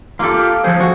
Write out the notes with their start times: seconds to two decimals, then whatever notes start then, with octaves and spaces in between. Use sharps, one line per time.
0.19 A#3 F4 G4 A4
0.64 F3 G#4 A4 C5
0.80 F3 F#4